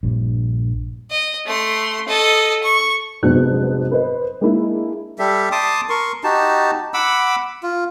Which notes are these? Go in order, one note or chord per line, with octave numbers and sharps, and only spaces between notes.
A#1 G2
D#5
A3 C6
A4 D#5
C#6
F1 G#2 F#3 B3 D4 F#6
B4 C5 D#5
G#3 A#3 D4 E4
G3 G4 A4 E5
A5 C6 D6 D#6
A#4 C6 C#6
D#4 F#4 G4 A5
F#5 B5 D6 E6
F4